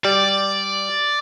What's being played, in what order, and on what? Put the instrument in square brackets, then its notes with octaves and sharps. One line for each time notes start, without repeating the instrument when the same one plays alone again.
[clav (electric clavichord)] G3 [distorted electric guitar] D5